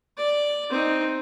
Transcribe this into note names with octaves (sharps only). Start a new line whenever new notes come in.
D5
C4 D#4